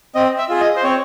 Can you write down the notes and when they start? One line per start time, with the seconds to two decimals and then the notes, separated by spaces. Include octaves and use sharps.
0.15 C4 D#5
0.38 E5
0.49 F4 G#4
0.61 D#5
0.76 C5
0.83 C4 C#5